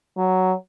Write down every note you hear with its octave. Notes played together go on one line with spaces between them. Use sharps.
F#3